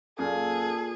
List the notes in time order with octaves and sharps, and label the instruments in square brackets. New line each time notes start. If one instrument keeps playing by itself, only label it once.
[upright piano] F#2 [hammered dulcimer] A#2 [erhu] G#4 [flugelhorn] A4